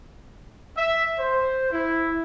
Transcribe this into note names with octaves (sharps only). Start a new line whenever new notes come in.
E5
C5
E4